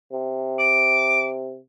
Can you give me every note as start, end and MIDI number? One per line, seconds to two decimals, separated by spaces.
0.13 1.59 48
0.59 1.28 86